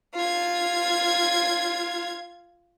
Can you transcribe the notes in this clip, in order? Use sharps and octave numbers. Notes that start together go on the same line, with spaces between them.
F4 G#6